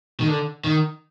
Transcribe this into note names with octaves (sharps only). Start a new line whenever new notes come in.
D#3
D3
D#3